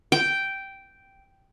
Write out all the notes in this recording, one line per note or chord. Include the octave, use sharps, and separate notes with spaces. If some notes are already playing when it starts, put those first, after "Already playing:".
G5